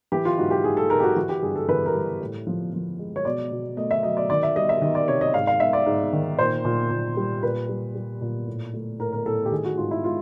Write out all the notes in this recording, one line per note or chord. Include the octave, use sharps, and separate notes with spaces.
E3 G4
F4
G#2 F#4
G4
G#2 G#4
A4
G#2 A#4
G4
F#4
E3 F#4
G4
G2 G#4
A4
E3 B4
A#4
G3
A2
F3
F3
G#3
C#5
B2 D5
B2
A3 D#5
E5
F#3 D#5
D5
D#3 D5
E5
G3 D#5
E5
D#3 D#5
D5
C3 C#5
D#5
G#2 F5
F5
G#2 E5
D5
G#2
D#3
A#2 C5
A#2
A#2
G3
A#2 B4
G3
G3
A#2
A2
A3
A2 A#4
A#4
A2 A4
G4
D#3 G#4
F#4
G#2 F4
E4
G#3 F4